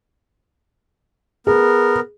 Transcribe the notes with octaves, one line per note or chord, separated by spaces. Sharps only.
B3 G#4 A#4